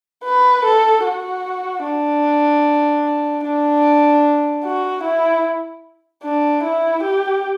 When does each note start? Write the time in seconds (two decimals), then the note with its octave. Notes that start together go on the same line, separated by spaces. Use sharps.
0.25 B4
0.65 A4
1.05 F#4
1.84 D4
3.44 D4
4.64 F#4
5.04 E4
6.24 D4
6.64 E4
7.03 G4